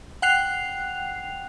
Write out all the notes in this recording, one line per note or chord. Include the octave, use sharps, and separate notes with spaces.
F#5 G5 F#6 C7 F7